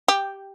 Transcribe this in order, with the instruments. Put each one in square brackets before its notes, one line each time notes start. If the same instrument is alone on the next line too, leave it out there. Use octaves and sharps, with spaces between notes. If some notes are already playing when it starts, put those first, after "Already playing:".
[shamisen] G4